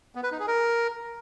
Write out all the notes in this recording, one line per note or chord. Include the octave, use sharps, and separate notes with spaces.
B3
B4
D#4
G#4
A#4